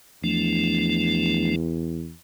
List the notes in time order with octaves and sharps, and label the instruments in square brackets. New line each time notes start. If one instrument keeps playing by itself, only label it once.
[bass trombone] E2 [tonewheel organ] F3 A3 D4